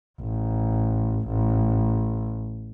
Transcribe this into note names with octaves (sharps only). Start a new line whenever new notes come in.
A1
A1